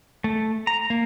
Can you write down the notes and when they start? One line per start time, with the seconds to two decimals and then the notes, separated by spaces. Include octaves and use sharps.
0.24 A3
0.67 A#5
0.90 A#3